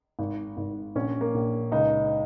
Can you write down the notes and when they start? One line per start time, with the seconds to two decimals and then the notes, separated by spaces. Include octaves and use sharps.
0.19 G#1
0.57 G#1
0.95 A#1 C#4
1.21 A#3
1.34 A#1
1.72 C#2 D#4